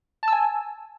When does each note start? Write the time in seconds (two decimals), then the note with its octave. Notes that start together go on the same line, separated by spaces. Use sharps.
0.23 A5
0.28 E6
0.33 G#5